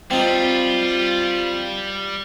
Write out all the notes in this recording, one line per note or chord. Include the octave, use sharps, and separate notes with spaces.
G3 C4 D#4 F4